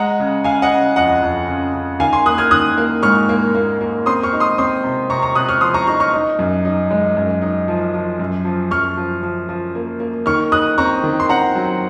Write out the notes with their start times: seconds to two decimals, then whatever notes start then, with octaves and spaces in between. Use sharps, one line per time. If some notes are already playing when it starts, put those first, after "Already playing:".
Already playing: G#3 F#5 A#5
0.20 C#3
0.44 C#3 F5 G#5
0.62 D#5 F#5
0.70 C#3
0.96 F2 D#5 F#5
1.22 F2
1.48 C#3
1.74 C#3
2.00 D#3 F5 G#5
2.13 G#5 C6
2.26 A#3 D#6 F#6
2.38 F6 G#6
2.51 D#3 D#6 F#6
2.77 A#3
3.03 G#2 C#6 F6
3.29 A#3
3.55 A#3
3.81 A#3
4.06 C4 C6 D#6
4.23 C#6 F6
4.33 D#4
4.40 C6 D#6
4.58 C4 C6 D#6
4.84 C3
5.10 C3 A#5 C#6
5.22 A#5 C#6
5.35 C3 D#6 F#6
5.49 C#6 F6
5.61 F3 C6 D#6
5.74 A#5 C#6
5.87 D#4 A#5 C#6
6.00 C#6 F6
6.13 D#4
6.39 F#2
6.65 D#4
6.91 G#3
7.17 F#2
7.42 D#4
7.68 F3
7.94 F3
8.19 F#2
8.45 F3
8.71 F#2 C#6 F6
8.97 F3
9.23 F3
9.49 F3
9.75 A#3
10.00 A#3
10.26 D#3 C#6 F6
10.52 D#4 D#6 F#6
10.78 C4 A#5 C#6
11.04 D#3
11.20 C6
11.29 C4 F#5 A#5
11.55 F#3